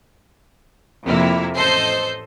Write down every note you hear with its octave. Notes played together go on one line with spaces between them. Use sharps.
F2 C3 F3 A#3 E4
A1 A4 C5 D#5 G6 C7